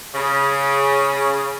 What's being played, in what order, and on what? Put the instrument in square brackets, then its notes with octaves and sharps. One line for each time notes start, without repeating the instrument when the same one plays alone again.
[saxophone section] C#3